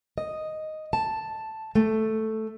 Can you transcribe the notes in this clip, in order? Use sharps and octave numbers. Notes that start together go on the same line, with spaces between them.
D#5
A5
A3